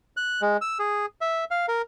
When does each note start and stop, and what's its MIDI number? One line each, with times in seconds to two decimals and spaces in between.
0.17 0.41 90
0.42 0.57 56
0.61 0.78 88
0.79 1.06 68
1.21 1.44 76
1.51 1.66 77
1.68 1.82 70